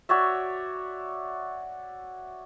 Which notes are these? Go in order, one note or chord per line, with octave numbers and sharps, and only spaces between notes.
F#4 C#5 D5 E5